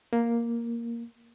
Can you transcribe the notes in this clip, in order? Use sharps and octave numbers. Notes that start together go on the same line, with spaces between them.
A#3